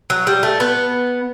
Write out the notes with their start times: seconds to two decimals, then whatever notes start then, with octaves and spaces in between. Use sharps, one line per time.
0.10 F#3
0.27 G3
0.43 A3
0.60 B3